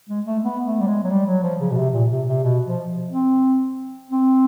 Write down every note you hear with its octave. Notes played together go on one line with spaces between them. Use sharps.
G#3
A3
B3
A3
G3
G#3
F#3
G3
F#3
F3
C#3
B2
C3
A#2
C3
C3
B2
F3
C4
C4